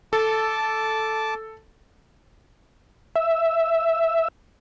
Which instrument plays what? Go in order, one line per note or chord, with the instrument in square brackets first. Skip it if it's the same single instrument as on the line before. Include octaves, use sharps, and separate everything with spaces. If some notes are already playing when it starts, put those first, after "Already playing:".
[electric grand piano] A4 [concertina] A5 D6
[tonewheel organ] E5